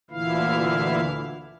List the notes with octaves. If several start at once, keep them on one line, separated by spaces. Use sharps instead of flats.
D2 A#2 D3 E3 E4 F5